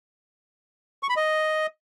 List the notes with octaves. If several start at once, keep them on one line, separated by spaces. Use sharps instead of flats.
C#6
B5
D#5